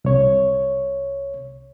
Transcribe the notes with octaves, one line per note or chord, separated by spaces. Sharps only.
C2 C#5